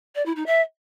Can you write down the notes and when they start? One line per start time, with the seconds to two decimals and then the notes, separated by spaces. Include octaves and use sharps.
0.15 D5
0.26 E4
0.36 D#4
0.46 E5